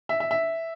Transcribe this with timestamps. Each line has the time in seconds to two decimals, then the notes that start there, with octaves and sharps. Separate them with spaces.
0.09 E5
0.20 E5
0.31 E5